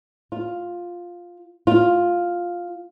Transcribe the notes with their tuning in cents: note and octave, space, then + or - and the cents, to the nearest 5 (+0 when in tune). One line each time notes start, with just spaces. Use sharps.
F4 +5
F4 +5